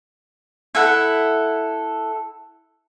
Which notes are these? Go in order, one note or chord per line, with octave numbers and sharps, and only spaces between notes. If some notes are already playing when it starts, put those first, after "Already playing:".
E4 A4 F#5